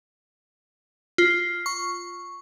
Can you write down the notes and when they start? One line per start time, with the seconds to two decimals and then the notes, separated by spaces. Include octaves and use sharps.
1.18 F4
1.66 C#6